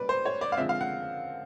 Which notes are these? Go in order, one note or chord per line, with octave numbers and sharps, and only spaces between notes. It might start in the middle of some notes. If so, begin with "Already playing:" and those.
Already playing: B2 G3 A#3 C#4 B4 D5
C5
C#5
D5
F5
D3 F3 G#3 C4 E5
F5
F#5